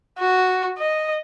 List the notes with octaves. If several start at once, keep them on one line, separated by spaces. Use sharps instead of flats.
F#4
D#5